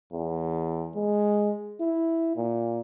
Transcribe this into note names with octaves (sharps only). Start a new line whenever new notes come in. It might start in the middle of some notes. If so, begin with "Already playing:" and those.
E2
G#3
E4
A#2